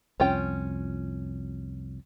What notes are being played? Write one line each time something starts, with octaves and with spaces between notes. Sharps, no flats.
C2 F2 C#4 F4 G5